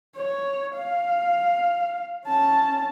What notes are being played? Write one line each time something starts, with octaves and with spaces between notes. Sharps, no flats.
C#5
F5
C#4 A5